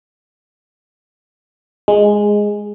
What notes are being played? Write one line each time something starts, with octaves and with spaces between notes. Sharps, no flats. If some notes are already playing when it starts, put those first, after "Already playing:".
G#3